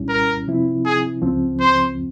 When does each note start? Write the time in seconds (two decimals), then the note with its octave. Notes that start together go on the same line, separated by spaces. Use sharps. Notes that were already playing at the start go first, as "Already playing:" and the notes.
Already playing: C2 A#2 G3 C#4 E4
0.09 A#4
0.48 C3 F3 C4 E4
0.85 G#4
1.22 C#2 C#3 F3 C4
1.60 C5